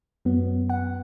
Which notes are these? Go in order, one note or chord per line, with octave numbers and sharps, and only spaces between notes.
F#2 F#3 B3
F#5